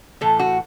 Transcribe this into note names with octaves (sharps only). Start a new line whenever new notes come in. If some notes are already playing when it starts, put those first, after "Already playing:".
A2 E3 A3 A4
F#4